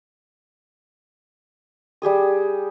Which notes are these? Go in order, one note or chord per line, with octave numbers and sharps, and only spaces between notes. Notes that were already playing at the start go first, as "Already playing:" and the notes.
G3 G4 G#4 D#6